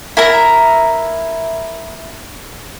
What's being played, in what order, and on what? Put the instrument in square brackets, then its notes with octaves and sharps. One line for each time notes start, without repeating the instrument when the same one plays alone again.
[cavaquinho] E4 A#4 E5 A#5